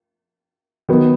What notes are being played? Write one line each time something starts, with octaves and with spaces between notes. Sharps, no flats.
D#3 F#3 B3